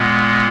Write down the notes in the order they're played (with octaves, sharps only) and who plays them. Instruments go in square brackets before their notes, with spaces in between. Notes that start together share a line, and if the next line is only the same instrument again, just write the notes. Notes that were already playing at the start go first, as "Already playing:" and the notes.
Already playing: [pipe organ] A#2 G#3 B3